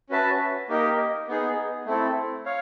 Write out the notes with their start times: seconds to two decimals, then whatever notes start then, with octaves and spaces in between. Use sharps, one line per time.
0.09 C#4 F#4 B4 E5 A5
0.69 A#3 D#4 G4 A#4 D#5
1.28 B3 D#4 G#4
1.86 A3 C4 E4 A4
2.46 C#5 F5